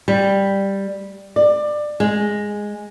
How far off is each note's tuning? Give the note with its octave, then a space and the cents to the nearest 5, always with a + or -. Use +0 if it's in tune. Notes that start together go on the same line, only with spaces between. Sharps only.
G3 +5
D5 +20
G#3 -5